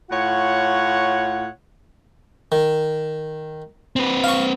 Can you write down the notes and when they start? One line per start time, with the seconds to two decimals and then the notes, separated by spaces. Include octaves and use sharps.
0.11 A2 F4 C#5 F#5
2.52 D#3
3.96 C4 B4
4.24 F5 C#6